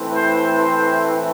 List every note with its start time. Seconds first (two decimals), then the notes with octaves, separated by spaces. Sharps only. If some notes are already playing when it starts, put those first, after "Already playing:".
Already playing: A2 E3 A3 C4
0.13 C5
0.57 C5